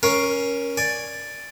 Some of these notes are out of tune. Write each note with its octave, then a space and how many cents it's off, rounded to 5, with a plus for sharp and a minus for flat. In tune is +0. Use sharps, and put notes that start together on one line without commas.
C#4 +0 A#4 +20 F5 +0
D5 +0 G#5 +0